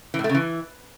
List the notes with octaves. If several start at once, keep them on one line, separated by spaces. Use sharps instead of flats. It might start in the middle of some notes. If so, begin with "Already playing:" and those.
E3
A2
A3
C#3
E3